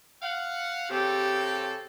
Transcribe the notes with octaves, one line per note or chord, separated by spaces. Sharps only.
F5 F#5
C#3 C4 G4 A4